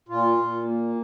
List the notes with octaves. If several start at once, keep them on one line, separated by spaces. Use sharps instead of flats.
A#2 F4
A#2
A#3